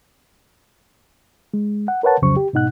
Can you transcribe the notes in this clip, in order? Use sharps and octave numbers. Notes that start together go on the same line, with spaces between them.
G#3
F#5
A#4 B4 C#5 F#5 A5
C2 F2 C#3 F#3 C5 C#6
G4
G#2 B2 D#4 F#5 F#6